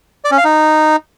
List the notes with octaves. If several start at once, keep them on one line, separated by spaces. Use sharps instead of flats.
D5
C#4
F5
D#4